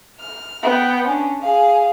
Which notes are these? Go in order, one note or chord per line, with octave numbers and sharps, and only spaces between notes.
F6
B3 G5
C#4 D4
G#4 F5